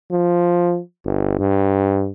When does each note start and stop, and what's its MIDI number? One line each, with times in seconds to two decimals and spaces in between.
0.12 0.79 53
1.05 1.35 31
1.39 2.11 43